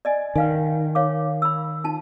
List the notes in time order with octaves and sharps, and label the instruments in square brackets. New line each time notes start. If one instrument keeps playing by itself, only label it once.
[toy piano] D5 D#5 G#5
[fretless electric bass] D#3 [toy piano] B4 F5 G#5
[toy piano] C#5 F5 D6
B5 E6
D#4 F4 A5